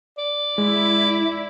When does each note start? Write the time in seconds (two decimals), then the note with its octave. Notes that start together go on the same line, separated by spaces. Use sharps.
0.18 D5
0.58 G#3 E4